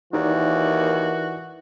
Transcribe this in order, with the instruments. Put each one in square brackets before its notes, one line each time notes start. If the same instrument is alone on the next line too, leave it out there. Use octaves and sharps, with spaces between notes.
[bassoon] D#2 [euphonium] E3 [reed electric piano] D#4 A#4 D5 [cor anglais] F#4